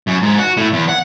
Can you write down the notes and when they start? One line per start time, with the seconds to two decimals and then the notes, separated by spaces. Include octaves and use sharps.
0.07 F#2
0.22 G#2
0.38 F#4
0.57 A2
0.73 E2
0.89 F#5